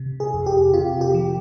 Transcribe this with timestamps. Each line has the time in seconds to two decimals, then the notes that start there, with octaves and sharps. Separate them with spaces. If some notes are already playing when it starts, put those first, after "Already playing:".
Already playing: C3
0.20 G#4
0.34 F2
0.46 G4
0.73 C3 F4
1.01 G4
1.14 F3